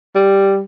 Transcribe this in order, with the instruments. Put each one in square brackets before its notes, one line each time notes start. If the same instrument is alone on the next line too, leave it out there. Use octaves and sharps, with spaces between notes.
[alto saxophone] G3